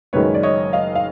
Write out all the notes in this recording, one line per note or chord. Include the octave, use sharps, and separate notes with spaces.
F#1 F#2 D#3 G#3 B4 C#5
D5
C#5 D#5
D#5 F5
F5